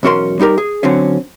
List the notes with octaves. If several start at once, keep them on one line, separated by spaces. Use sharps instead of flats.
B1 E2 C#4 F#4 A#4 C6
G3 D#4 G4 A#4
G#4
D3 F#3 C4 C#4